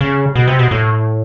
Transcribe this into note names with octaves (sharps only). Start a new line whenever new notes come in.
C#3
B2
C3
B2
A2